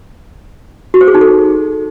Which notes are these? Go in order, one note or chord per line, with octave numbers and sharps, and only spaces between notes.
F#4
C5
G#4
D#4
A4